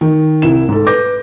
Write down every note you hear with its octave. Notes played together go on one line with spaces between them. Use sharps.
D#3
C2 E4 E7
G#2 A4
B4 D6 G6 A#6